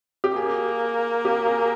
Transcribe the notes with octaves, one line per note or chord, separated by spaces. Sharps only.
G4
A#3 G#4
G4
G#4